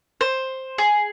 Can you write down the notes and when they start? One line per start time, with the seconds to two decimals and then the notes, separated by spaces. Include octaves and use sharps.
0.21 C5
0.78 G#4